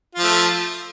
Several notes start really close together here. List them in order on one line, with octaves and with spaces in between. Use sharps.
F4 F3 A3